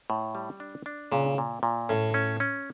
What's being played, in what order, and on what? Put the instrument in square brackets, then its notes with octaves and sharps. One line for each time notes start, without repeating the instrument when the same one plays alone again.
[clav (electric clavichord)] A2
G3
D4
D4
[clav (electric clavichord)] A#2 [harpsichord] C#3
[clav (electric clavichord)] A#2
A#2
[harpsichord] A2 [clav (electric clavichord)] C#4
[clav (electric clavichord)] C#4
C#4